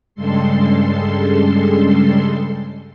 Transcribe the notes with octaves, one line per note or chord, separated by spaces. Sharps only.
G2 C#3 G3 G#3 A4 C6